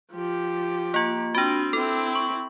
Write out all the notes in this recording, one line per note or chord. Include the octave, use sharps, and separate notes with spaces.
F3 G4
A#3 F4
C4 D4 F#4
C4 E4 A4
C#6